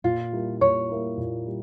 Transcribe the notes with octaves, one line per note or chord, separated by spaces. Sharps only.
A#2 F4
G3 A#3 E4 A#4
A#2 C#5
G3 A#3 E4 A#4
A#2
G3